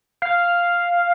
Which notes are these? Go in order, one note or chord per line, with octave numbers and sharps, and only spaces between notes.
F5